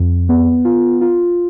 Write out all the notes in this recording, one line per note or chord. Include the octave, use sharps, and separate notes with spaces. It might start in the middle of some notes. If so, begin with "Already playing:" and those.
Already playing: F2
B3
F4
F4